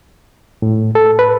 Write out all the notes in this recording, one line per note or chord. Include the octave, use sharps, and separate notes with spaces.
A2
A4
B4